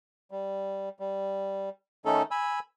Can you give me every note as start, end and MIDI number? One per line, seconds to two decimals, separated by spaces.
0.31 0.89 55
1.00 1.69 55
2.05 2.22 51
2.05 2.22 57
2.05 2.22 61
2.05 2.22 63
2.05 2.22 69
2.31 2.59 80
2.31 2.59 83
2.31 2.59 88